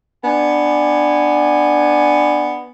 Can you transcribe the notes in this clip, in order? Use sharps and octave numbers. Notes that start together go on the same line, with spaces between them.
B3 D4 G#5